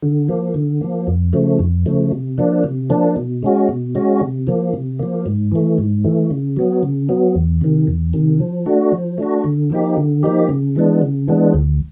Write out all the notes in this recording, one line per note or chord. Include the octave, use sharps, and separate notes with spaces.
D3
F3 A#3
D3
F3 A#3
F2
C#3 F3 A3
F2
C#3 F3 A3
C3
F3 A#3 D4
C3
F3 A#3 D4
B2
G#3 C#4 F#4
B2
G#3 C#4 F#4
C3
F3 A#3
C3
F3 A#3
G#2
E3 A3
G#2
E3 A3
C#3
F#3 B3
C#3
F#3 B3
E2
C3 D#3
E2
C3 D#3
F3
A3 D4 F#4
F3
A3 D4 F#4
D3
F3 A#3 D#4 G4
D3
F3 A#3 D#4 G4
C#3
E3 G#3 B3 D4
C#3
E3 G#3 B3 D4
D2